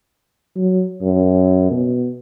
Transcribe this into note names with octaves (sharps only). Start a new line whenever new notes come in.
F#3
F#2
B2